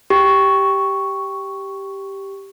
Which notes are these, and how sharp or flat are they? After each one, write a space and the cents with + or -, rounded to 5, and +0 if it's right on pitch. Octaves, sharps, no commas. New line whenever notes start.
G4 +0 C#6 +0